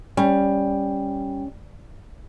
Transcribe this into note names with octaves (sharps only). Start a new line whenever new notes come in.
G3 C#4